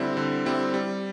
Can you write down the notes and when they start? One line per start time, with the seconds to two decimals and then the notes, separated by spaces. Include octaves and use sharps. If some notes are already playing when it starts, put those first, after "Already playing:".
Already playing: D3 G3 C4 E4
0.17 D3
0.45 G3 C4 E4
0.74 G3